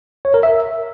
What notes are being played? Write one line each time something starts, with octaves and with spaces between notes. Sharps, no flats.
C#5
A#4
E5